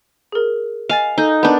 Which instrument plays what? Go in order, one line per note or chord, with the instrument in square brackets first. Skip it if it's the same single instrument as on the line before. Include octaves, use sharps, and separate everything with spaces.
[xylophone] G#4 A#4
[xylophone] D#5 G#5 A6 [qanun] F5
[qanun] D#4 [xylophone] A4 D#5 G6
[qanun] B3 D4 [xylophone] A#4 G6